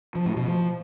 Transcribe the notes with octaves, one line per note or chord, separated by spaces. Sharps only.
F3
A2
B2
F3